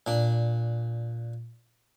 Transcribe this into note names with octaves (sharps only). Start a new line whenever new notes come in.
A#2 D4